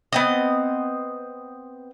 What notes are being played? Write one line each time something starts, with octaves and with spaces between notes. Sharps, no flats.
B3 C4 D#5